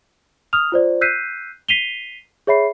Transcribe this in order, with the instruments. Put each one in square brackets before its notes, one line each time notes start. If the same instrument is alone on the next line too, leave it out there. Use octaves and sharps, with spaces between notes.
[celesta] D#6 F6 F7
F4 C5 D5
E6 F#6 G6 B6 C7 D#7
B6 C7 D#7 F7 G7
G#4 C#5 E5 B5 C7